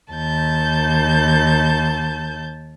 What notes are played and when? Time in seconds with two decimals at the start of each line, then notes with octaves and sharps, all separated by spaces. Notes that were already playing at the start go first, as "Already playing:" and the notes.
0.12 D#2 A5 G6